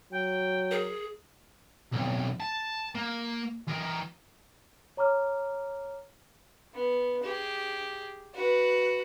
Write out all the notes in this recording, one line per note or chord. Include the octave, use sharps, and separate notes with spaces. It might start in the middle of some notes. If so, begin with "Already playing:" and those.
F#3 G5
G#4 A#4
B1 F2
A5
A#3
E3 A#4
C#5 A#5 D6 F6
B3
G4 G#4
F#4 B4